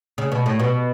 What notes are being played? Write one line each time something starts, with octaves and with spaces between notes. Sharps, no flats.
C#3
B2
A2
B2